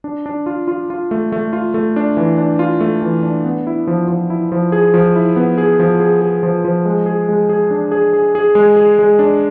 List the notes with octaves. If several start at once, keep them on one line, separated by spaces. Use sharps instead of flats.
D4
D4
F4
F4
F4
A3
A3
F4
A3
D4
E3
D4
F4
A3
E3
D4
B3
E4
F3
F3
E4
F3
G#4
F3
E4
B3
G#4
F3
G#4
G#4
F3
F3
G#3
G#4
G#3
G#4
D4
G#4
G#4
G#4
G#3
G#4
G#3
D4